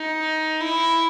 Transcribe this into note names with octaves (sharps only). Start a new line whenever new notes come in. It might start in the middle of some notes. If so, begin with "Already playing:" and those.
Already playing: D#4
E4